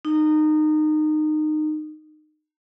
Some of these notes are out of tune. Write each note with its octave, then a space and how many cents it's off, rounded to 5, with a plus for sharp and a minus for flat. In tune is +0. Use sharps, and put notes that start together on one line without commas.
D#4 -20